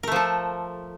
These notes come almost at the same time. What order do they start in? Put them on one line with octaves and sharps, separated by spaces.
A#4 A3 F3 A4